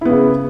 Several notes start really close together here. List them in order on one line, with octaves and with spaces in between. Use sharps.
E4 B3 C#3